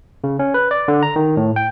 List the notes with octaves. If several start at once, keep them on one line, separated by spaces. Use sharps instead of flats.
C#3
C#4
B4
D5
D3
A#5
D#3
A2
G5